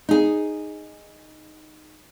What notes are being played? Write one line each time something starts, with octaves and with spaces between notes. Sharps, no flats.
D#4 G#4